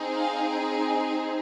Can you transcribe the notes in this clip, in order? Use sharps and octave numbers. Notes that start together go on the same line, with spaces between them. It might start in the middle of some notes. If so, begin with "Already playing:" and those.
Already playing: C4 D#4 G#4
F5
G#5